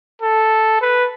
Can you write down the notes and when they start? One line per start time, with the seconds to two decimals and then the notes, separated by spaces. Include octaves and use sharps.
0.22 A4
0.81 B4